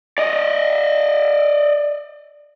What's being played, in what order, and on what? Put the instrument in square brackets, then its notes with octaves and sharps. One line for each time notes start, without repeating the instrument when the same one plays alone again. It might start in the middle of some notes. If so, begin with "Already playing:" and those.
[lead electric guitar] D5 D#5